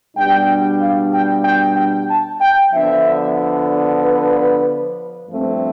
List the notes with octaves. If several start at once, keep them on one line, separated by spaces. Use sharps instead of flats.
B2 G3 D4 G5
F5
G5
G5
G5
A5
G5
D3 F3 B3 D4 E5
B4
G2 F3 A3 C4